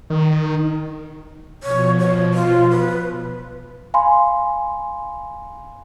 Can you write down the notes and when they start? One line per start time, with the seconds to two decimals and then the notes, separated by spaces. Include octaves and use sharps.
0.10 D#3
1.63 B2 F3 C#5
1.99 C#5
2.34 F4
2.70 B4
3.94 F5 G#5 B5 C6